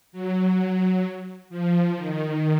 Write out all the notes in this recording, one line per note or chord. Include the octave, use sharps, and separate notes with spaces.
F#3
F3
D#3